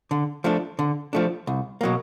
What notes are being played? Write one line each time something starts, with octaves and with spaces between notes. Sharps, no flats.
D3
F3 A3 D4
D3
F3 A3 D4
C2
B2 F#3 A#3